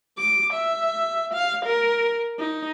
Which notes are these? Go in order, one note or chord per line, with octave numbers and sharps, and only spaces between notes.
D6
E5
F5
A#4
D#4